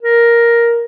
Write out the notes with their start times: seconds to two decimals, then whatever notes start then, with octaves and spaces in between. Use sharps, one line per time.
0.03 A#4